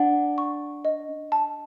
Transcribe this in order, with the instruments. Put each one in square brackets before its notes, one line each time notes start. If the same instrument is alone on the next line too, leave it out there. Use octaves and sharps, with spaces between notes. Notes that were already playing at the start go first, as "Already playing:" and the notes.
Already playing: [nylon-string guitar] D4 [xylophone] F#5
[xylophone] C#6
D#5
A5